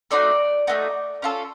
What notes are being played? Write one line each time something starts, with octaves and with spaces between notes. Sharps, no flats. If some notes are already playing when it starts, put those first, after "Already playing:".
A3 C4 D#4 F#4 D5
A3 C4 D#4 F#4
C#4 F4 A4